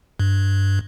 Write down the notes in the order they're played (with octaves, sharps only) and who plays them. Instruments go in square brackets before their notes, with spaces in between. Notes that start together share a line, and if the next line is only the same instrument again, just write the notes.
[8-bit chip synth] G2